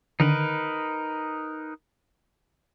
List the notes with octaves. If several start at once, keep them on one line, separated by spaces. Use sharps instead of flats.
D3 D#3 D#4 A#4 B4